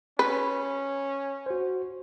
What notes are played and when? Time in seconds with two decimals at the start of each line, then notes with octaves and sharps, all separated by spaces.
0.19 C#4 B4
1.46 F#4 C5